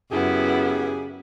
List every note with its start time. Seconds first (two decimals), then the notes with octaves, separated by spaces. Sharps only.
0.12 F#2 C#3 B3 E4 G4 G#4